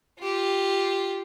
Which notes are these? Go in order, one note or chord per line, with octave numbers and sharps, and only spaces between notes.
F4 G4